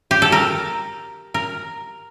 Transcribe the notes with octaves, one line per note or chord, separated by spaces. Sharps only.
G4
A4
A#4
A#4